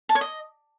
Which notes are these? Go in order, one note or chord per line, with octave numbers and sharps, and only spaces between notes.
A5
C#5
D#5